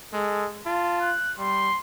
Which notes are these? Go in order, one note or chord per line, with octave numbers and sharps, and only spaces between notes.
G#3 A4
F4 A5
F#6
G3 C6